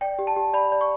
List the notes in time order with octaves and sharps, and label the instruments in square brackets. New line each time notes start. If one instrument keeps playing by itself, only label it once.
[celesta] D5 G5
G4
A5
G4
D5 B5
D5
C#6